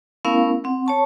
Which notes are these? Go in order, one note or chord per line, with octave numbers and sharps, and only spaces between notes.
A3 B3 C#4 E4 A#4 F5
C4 F#5
C#5 A5 C#6